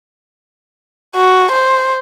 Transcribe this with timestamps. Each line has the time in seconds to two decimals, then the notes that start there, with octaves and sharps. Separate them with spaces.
1.16 F#4
1.52 C5